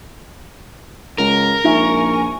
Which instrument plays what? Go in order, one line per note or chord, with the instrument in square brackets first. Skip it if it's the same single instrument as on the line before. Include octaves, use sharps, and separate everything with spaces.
[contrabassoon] C#2 [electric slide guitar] A#4
[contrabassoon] A#1 [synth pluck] D#4 F4 E5 [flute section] G#5 C#6